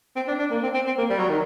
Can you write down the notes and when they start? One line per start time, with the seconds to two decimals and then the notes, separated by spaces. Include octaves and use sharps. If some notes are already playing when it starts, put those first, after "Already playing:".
0.16 C4
0.28 D4
0.39 D4
0.51 A#3
0.63 C4
0.74 C4
0.87 C4
0.98 A#3
1.09 G3
1.19 F#3
1.29 D#3